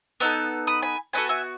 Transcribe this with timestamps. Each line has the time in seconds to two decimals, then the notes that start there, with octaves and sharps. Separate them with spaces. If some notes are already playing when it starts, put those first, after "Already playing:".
0.20 B3 D#4 A4 E6
0.67 B5 D#6
0.82 G#5 B5
1.13 B3 D#4 F#4 A4 G#5 B5
1.29 E5 G#5